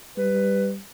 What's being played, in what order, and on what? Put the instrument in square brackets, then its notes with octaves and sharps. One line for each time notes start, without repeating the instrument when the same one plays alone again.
[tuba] G3 [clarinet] B4